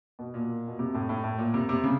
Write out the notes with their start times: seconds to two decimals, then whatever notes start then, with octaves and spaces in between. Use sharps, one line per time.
0.19 B2
0.34 A#2
0.68 B2
0.79 C3
0.94 A2
1.09 A2
1.24 A2
1.38 A#2
1.54 C3
1.69 C3
1.84 C#3